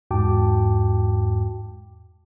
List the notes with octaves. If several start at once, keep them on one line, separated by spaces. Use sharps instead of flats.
E2 G#2 F#4 G5 A5 D6